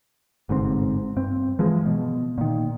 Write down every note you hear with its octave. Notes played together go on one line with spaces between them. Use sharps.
G1 G#2 C3 C4
G2 C4
E3 F3 G#3
B2
A#2 D#3